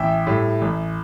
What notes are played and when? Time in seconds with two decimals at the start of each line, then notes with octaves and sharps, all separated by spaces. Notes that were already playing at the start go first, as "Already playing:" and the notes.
Already playing: A1 E5 G5
0.27 A2 G3
0.62 A1